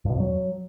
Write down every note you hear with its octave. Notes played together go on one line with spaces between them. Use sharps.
G2
B2
F2
F#3